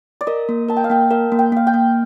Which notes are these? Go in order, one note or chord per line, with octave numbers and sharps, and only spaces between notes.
D5
A#4 D#5
A#3
A#4 A5
G5
F5
A#3 G5
A#4 F5
A#3
G5
A#3 F5
G5
A#3